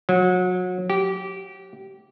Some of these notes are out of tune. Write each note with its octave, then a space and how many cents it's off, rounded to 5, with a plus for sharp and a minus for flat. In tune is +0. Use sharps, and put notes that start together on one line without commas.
F#3 -30
G4 -20